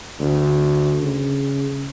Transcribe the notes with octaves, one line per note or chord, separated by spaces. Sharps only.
D2
C#3